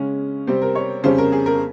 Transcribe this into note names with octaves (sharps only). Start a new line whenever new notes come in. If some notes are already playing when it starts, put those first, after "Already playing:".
Already playing: C#3 G#3 C#4
C3 G3 C4 C5
A#4
C#5
F2 C#3 G3 C#4 C5
A#4
G#4
A#4